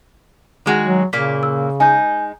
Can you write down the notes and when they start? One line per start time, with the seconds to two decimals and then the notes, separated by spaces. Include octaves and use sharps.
0.66 D#3 G#3 F#4
0.84 F#3
1.13 A#2 C#3 A#3 B6
1.43 E6
1.80 G#3 D#4 G#5 G6